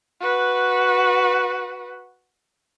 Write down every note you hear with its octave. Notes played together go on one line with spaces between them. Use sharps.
F#4 B4